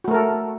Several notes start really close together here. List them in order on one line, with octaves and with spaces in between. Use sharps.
F#4 A3 A#4 A4